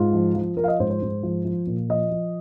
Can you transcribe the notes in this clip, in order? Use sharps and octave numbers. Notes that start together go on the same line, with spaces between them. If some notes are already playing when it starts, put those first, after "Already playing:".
Already playing: G#2 F4
F3
F3
F3 A#4
F5
D#5
G#2 C5
C5
G#2
F3
F3
A#2
F3 D#5
F3